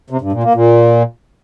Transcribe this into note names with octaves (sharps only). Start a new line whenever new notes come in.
C3
G2
A#2
A#3
A#2